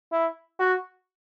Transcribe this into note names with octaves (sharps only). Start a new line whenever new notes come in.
E4
F#4